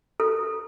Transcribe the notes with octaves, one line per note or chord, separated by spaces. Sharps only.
A4